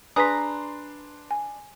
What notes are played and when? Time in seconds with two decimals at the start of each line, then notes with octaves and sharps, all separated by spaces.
0.16 D4 G#4 B4 A#5 C6 D#6 B6
1.31 G#5